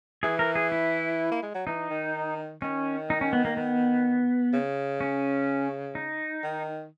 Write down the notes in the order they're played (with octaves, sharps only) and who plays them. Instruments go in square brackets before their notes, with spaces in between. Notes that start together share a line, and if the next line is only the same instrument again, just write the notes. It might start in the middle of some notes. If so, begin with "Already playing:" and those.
[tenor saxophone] E3 [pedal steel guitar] G#4
[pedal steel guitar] A#4
G#4
E4
[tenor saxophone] A#3
G#3
F#3
[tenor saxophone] E3 [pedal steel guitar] D#4
[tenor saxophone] D#3
[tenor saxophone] D#3 [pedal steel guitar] C#4
[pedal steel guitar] D#4
C#4
B3
A#3
B3
[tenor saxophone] C#3
[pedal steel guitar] C#4
D#4
[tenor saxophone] D#3